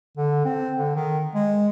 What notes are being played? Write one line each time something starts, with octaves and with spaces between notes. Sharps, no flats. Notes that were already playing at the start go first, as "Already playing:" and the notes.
D3
C4
D3
D#3
G#3